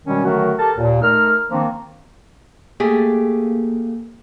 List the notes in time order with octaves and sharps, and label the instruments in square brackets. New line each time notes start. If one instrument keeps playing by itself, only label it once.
[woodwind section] B2 D#3 G3 G#3 C#4
D3 D#3 F#3 A3 F#4 A#4
G4 A4 A#4 A5
D#2 A#2
A3 D#4 A#4 F6
D#3 F3 A#3 C4 D4
[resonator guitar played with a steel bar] A3 G4 G#4 [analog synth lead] A#3